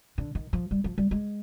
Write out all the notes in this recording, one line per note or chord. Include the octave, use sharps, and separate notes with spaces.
D3
D#3
F3
G3
F3
G3
G#3